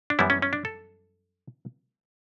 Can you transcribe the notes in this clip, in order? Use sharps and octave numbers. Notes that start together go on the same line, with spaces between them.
D4
F#2 E3 G3 B3 E4
C#4
C#4
D4
A4